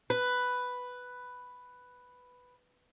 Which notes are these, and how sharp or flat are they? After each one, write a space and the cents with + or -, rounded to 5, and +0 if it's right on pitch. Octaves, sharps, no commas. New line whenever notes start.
B4 +5